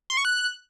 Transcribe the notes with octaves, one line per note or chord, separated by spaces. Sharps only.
C6
C#6
F#6